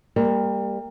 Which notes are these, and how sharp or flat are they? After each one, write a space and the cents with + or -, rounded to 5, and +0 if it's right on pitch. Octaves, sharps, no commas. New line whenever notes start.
G3 +25 A#3 -10